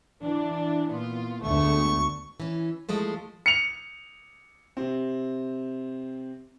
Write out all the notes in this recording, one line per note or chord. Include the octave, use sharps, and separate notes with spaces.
E3 D4
A#2 B3 F4
D2 D3 G#3 A3 B3 C#6
E3 C#4
E2 F3 G#3 A3 C5
C#7 F7
C3 C4